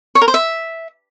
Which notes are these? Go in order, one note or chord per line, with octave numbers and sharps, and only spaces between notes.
C#5
A#4
C5
E5